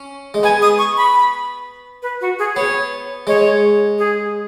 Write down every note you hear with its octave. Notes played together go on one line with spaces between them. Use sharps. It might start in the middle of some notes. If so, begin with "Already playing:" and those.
Already playing: C#4
G#3
B3 G#5
D#6
C#6
B5
B4
F#4
G#4
B3 C#5
G#3 C#5
G#4